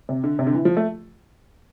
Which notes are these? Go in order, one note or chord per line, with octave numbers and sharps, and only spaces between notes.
C3
D3
C3
D3
E3
F3
A3